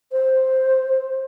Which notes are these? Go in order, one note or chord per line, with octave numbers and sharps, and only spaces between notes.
C5